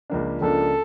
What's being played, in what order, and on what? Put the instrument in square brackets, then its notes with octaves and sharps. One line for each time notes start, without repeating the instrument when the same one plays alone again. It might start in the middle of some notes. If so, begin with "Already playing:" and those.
[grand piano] C#2 C#3 F3 A#3 D4
[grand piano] C#2 C#3 F3 A#3 D4 [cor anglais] A4